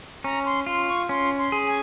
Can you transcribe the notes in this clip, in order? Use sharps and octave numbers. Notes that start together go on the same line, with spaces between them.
C#4 A#5
C6
F4 C6
C#6
C#4 C6
C6
G#4
G#5